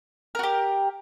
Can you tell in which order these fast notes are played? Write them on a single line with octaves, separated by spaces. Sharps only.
A#4 F#4 G4